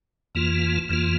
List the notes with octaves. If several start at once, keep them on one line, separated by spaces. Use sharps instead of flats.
F2 E3 A#3 F4
F2 E3 A#3 F4